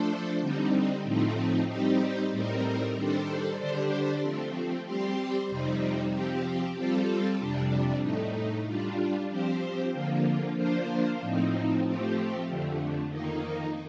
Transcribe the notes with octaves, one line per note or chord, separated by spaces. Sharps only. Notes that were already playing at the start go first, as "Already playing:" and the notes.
Already playing: F3 A3 D4 A4 C5
D3 G3 C4 D#4
A2 F3 A3 C4 D#4
G3 C4 D#4 G4
A2 G3 C4 D#4 A#4
D#3 G3 D4 A4 C5
D3 G3 D4 G4 C5
F3 A3 C4
G3 C4 G4 C5
F2 C3 G3 C4 D#4
F3 C4 G4
G3 C4 F4 A4
F2 C3 G3 D4
A2 A3 D#4
G3 D4 F4
F3 C4 G4 C5
D3 F3 A#3 F4
F3 A#3 D4 F4 C5
A2 F3 C4 D#4
F3 A3 C4 G4
F2 D3 A3
F2 D#3 A#3 D#4